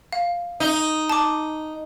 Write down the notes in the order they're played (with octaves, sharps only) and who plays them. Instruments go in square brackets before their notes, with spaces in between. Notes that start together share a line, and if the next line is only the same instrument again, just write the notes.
[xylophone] F5
[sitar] D#4
[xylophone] A5 D6